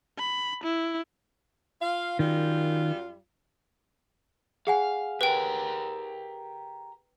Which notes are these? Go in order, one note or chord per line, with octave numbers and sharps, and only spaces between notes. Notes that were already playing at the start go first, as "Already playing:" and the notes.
B5
E4
F4 F5
F#2 D#3 G3 F4
G#4 F5 F#5 G#5
G4 A#4 B4 G5